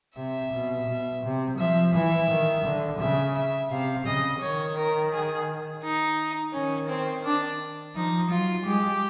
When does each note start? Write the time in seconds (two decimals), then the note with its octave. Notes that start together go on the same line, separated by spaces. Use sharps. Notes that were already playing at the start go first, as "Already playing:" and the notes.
0.17 C3 E5
0.52 B2
0.87 B2
1.23 C3
1.58 F3 E5
1.94 E3 E5
2.30 D#3
2.64 D3
3.00 C#3 E5
3.36 E5
3.71 C3 F5
4.06 C#3 D#5
4.41 D#3 C#5
4.77 A#4
5.12 G#4
5.82 D#4
6.53 D#3 C#4
6.88 C4
7.24 D4
7.95 F3 D#4
8.30 F#3 F4
8.65 G#3 G4